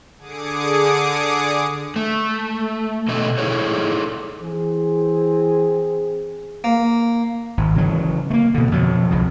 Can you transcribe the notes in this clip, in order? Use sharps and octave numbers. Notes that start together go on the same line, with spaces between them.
D3 G#4 D6 D#6 C#7
A3
B2 D3 A3 B3 A4 D#5
D#4 E4 G#4 A4 C#5
E3 C4 G#4
A#3
G#1
C#3 E3 F#3
A3 A#3
B2 D3
F2 B2 F#3
C2 F2 C#3